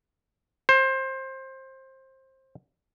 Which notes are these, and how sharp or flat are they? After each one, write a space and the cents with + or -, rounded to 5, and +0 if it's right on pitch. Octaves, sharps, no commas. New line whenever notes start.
C5 +20